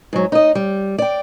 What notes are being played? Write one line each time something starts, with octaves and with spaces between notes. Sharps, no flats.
G#2 F#3
D#4 D#5
G3
D5 G5